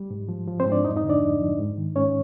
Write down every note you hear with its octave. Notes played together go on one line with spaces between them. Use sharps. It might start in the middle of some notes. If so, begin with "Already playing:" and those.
Already playing: G3
G#2
F3
F3
C4 C5
G#2
D4 D5
F2 D#4 D#5
D#4 D#5
D3
D4 D5
F2
F3
G#2
D#3
G#2 C#4 C#5